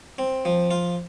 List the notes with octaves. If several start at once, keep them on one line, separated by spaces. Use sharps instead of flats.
C4
F3
F4